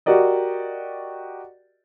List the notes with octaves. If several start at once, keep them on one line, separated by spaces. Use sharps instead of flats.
F#4 G4 A#4 D5 D#5